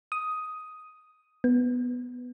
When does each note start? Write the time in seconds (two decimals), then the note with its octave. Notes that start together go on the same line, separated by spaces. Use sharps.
0.12 D#6
1.44 B3